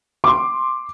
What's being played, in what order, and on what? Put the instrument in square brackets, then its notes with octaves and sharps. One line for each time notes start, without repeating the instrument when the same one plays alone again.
[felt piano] C6 D6